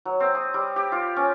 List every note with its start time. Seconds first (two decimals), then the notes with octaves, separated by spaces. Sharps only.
0.05 F#3
0.20 C4
0.35 D#6
0.54 G3
0.76 G4
0.92 F4
1.16 C#4